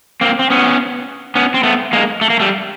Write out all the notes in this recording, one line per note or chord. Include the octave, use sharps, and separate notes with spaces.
A#3 C4
C4
B3 C#4
B3 C#4
C4
A3 B3
G#3 A#3
A3
A#3
G3 A3